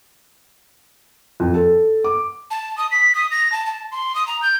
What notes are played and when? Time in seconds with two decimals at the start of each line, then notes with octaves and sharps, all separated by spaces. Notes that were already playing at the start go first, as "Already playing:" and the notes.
1.40 F2
1.54 A4
2.04 D6
2.51 A5
2.78 D#6
2.91 B6
3.15 D#6
3.31 A#6
3.52 A5
3.66 A5
3.92 C6
4.15 D#6
4.27 A#5
4.42 G6